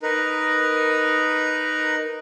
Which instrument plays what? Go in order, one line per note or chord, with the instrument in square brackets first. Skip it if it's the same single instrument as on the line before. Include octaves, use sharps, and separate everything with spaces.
[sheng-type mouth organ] D#4 A#4 B4